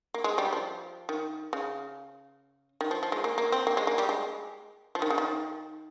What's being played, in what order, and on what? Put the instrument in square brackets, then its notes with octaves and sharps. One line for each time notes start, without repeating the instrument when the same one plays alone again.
[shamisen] A#3
G#3
G3
F3
D#3
C#3
D#3
F3
F3
G#3
A#3
A#3
C4
A#3
G#3
A#3
G3
G#3
F3
D#3
C#3
D#3